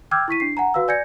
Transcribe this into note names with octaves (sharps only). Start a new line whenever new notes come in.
G5 D6 E6 F6 G6 G#6
E4 C#6 B6 D#7
D4 C7
F#5 G#5 A#5
F#4 B4 F5 E6
D5 G#5 G6 G#6 A#6 C#7